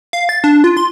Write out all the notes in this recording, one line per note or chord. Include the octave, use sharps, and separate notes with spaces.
F5
A6
D4
F4
C6